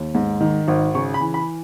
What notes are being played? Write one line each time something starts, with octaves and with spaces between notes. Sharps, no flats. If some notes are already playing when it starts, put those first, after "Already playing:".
Already playing: D#2
G#2
D#3
G#1
C#3 C#6
B5
E3
B5